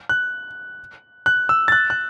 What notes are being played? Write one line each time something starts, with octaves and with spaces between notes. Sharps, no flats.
F#6
F#6
E6
A6
F#6
F#6